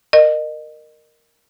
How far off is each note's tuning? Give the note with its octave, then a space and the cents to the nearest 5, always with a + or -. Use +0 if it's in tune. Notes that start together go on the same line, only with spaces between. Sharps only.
A#4 +0 D#5 -30